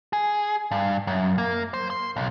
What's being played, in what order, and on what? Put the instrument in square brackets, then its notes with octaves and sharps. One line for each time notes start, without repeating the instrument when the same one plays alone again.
[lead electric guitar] G#4
G2
F#2
A#3
C5
C6
B1